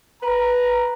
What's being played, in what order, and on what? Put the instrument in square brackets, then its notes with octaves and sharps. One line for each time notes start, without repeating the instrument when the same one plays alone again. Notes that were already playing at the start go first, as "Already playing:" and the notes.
[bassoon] B4 [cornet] A#5